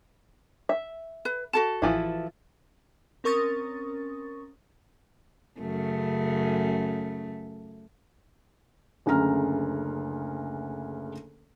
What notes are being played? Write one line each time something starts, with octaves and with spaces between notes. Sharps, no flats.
E5
B4
F#4 A4 A5
A1 E3 F3 E4
C4 C#4 A#4 C#6 D#6 A6
F#2 C#3 A3
F#1 D2 C#3 A#5 F6